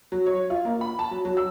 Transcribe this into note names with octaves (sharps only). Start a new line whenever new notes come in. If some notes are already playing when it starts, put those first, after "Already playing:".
F#3
C#5
F4
A#3
B5
A5
F#3
F#3
E6